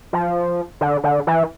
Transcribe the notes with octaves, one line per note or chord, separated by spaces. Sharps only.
F3
D3
D3
E3